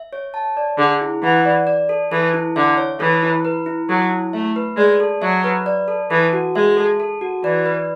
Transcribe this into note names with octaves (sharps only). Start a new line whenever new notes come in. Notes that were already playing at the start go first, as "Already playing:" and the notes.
Already playing: E5
C#5
A5
D5
D3 G#4
E4
E3 F#5
D5
D5
A4
E3 A4
E4
D3 E5
C#5
E3 A4
E4
B4
E4
F#3 A4
E4
A3 E5
B4
G#3 D5
A4
F#3 E5
B4
D5
A4
E3 A4
F#4
G#3 E5
A4
A4
F#4
E3 D5
B4